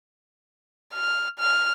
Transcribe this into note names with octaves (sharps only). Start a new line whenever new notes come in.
F6
F6